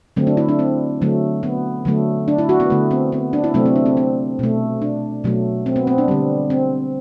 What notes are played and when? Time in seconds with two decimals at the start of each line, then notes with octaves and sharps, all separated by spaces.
0.16 D3 F#3 A3 C4
0.27 D4
0.37 E4
0.49 D4
0.59 C4
1.02 D3 F#3 A3
1.43 B3
1.85 D3 F#3 A3
2.28 D4
2.38 E4
2.49 F#4
2.60 B3
2.70 D3 A3
2.91 C4
3.12 B3
3.33 D4
3.44 E4
3.54 C3 F#3 A3 C4
3.66 C4
3.76 D4
3.86 C4
3.97 C4
4.39 B2 A3
4.82 D4
5.24 B2 F#3 A3
5.66 C4
5.76 B3
5.87 C4
5.98 D4
6.08 D3 G3
6.50 C4